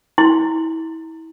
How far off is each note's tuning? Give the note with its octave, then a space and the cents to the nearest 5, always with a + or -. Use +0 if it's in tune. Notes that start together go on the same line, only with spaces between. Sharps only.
E4 -30 C6 +0